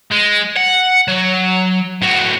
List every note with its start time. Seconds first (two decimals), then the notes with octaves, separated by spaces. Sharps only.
0.11 G#3
0.56 F#5
1.08 F#3
2.02 A2 F#4